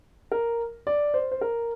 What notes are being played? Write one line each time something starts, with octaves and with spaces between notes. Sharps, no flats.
A#4
D5
C5
C5
A#4